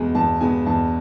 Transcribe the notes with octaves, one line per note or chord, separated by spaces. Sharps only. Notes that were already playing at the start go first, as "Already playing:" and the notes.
Already playing: E2 B2 G#3 B3 G#5
E2 A5
B2 G#3 B3 G#5
E2 A5